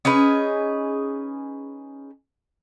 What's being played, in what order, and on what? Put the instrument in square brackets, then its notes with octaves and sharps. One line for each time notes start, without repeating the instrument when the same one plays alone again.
[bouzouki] C#4 D#4 G#4 B4